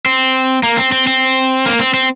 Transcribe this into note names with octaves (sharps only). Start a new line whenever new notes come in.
C4
A#3
C4
C4
C4
A#3
C4
C4